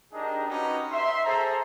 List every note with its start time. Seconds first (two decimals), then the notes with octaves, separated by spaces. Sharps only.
0.12 D4 D#4 G4 G#4 A#4 D#5
0.48 C#4 D#4 F#4 G4 B4
0.92 E5 C6
1.24 G#4 A4 C5 A#5